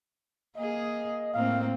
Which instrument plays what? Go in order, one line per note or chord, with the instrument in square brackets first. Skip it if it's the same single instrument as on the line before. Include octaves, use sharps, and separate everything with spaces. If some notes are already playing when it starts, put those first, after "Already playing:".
[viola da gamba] A#3 G#4 [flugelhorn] D#5
[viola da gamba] A2 A#3 C4 [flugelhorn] F5